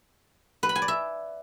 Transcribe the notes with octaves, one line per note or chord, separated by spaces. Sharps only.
B4
B5
G#5
D5
E5